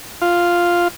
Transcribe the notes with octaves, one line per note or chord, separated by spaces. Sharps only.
F4